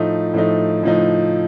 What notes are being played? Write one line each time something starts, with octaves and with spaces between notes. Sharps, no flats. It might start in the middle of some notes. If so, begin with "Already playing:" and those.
Already playing: A2 F3 A3 D#4
A2 F3 A3 D#4
A2 F3 A3 D#4